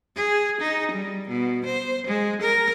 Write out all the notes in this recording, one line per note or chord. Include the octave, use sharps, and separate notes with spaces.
G#4
D#4
G3
B2
C5
G#3
A#4